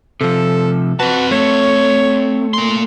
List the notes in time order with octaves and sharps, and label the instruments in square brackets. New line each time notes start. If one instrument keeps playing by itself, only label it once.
[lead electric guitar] C3 F3 [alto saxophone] A4
[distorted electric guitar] C4 A5 [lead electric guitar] F#4 [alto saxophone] B4
[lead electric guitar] A3 [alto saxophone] C#5
[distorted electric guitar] A#3 C6